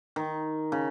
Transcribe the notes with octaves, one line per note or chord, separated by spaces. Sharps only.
D#3
C#3